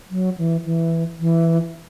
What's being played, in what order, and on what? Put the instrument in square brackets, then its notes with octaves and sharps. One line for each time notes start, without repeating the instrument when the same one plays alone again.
[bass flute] F#3
E3
E3
E3